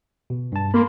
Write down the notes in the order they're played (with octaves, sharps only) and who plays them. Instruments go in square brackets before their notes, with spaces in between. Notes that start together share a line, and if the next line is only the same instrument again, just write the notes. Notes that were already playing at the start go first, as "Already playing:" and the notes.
[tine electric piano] B2
G2 A5
[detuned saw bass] A#3 [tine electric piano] B5 C6